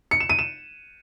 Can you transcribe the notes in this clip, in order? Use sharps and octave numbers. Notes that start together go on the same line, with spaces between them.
C#7
E7
D#7
E7